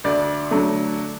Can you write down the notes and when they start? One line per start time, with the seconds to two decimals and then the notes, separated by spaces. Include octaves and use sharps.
0.04 D2 D5
0.51 D3 F#3 A3